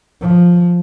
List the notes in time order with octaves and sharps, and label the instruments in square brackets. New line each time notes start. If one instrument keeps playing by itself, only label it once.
[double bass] F3